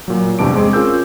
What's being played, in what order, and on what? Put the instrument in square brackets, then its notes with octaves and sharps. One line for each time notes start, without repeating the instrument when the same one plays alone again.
[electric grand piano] A#2 F#3
E2 G2 C3 A5 D6 D7
G#3 C4 G#4
C#4 F4 A#4 E6 G6